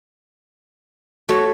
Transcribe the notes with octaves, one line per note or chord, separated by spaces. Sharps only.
A3 F#4 C#5